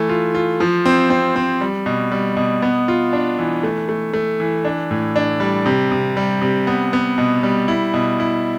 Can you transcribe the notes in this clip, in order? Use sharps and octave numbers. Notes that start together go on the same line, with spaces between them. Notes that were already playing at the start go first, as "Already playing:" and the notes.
Already playing: E3 A3
F4
F4
F3
C4
C4
C4
G3
B2
G3
B2
B3
F4
D4
E3
A3
A3
A3
E3
D4
A2
D4
G3
C3
C3
G3
C3
B3
B3
B2
G3
E4
B2
E4